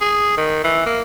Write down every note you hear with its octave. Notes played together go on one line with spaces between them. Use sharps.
G#4
D#3
E3
A#3